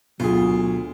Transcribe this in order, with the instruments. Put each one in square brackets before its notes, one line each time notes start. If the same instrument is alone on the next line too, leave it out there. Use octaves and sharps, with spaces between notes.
[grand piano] D2 G#4 [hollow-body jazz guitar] B2 [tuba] F#3 [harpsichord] F4